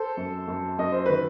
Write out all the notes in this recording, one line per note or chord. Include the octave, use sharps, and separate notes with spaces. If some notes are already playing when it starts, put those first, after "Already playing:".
Already playing: A4 C5
F#2
F#2
F#2 D#5
C5
D#3 B4